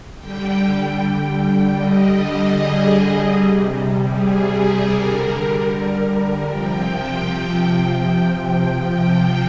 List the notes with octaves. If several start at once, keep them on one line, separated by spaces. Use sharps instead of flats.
D3 G3 G5
D3 G3 D#5
G#4
C3 G3
G#4
D3 G3 A#4
C3 F3 G5
C3 F3 G5